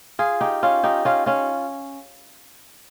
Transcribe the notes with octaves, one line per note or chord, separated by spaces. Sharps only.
F4 G#4
D#4 G4
C#4 F4
D#4 G4
C#4 F4
C#4 F4